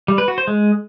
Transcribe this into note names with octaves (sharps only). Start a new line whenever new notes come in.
G3
B4
F#4
C5
G#3